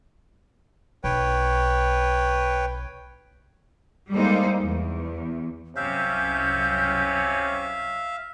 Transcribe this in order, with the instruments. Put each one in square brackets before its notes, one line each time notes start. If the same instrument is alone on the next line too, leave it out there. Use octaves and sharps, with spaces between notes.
[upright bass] B1 [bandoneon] B4 C#5 G5
[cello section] G3 G#3 A#3 D#4 A4 C5
E2
[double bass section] C2 F#2 [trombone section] C3 C#4 [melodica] E5 F5 [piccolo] G6